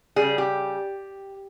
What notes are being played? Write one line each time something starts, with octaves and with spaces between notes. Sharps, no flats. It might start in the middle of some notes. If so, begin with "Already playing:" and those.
G3 G#4
C#3
G4